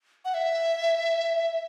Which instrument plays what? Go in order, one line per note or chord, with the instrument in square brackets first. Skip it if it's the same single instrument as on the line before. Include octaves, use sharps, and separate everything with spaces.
[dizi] F#5
E5